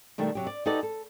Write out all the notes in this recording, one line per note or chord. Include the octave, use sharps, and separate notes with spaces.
B2 D#3 G3 A3
C3 F#3 G4
D5
D#4 F#4 G4 A4 B4 D5
A4